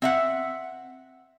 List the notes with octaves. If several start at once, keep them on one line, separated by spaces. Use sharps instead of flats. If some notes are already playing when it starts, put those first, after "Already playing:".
C4 E5 F#5